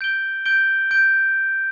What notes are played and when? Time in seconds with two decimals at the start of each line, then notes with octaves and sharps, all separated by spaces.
0.01 G6 D7 G7
0.46 G6 D7 G7
0.91 G6 D7 G7